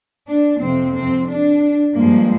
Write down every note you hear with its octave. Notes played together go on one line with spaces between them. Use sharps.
D4
F2 C3 F3 C4
C4
D4
G2 F3 G#3 A#3